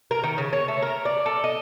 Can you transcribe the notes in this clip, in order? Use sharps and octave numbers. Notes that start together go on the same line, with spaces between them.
A#4
D#3
C#3
C#5
A3
A#4
D5
A4
D#5